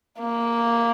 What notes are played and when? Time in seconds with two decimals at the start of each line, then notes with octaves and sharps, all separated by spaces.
0.20 A#3